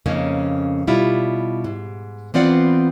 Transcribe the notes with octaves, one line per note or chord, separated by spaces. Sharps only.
F2 C#3 A#3 C#4 D#4
B2 G3 E4 F4
G#2
E3 B3 C4 F4 D5 F#5